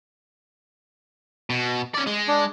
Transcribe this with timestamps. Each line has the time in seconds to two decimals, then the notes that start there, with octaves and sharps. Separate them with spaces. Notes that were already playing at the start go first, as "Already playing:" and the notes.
1.50 B2
1.94 C#4 D5
2.06 G#3
2.28 D4